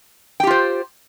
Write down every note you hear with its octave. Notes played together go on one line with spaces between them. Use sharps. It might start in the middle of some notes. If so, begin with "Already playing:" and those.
F4 G4 C5 G5